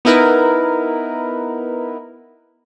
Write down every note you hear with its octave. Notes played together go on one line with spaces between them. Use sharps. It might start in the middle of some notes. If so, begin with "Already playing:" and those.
B3 D#4 E4 A#4 B4